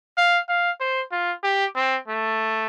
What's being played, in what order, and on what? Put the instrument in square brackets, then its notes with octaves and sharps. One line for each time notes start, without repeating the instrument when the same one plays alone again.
[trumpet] F5
F5
C5
F4
G4
C4
A3